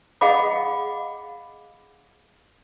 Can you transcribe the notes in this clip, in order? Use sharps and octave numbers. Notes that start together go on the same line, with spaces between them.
G#4 D#5 F5 F#5 B5 D6